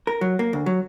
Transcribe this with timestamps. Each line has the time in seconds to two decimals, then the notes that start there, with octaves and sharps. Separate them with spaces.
0.07 A#4
0.21 F#3
0.39 A#3
0.53 D2
0.66 F#3